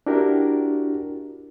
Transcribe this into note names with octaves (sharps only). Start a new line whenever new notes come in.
D4 E4 F#4 G4 A#4